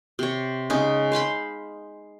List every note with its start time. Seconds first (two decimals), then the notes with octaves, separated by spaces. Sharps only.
0.19 C3 C#5
0.70 C#3 G#3 C#4 D#4
1.12 C5 F5 B5 C6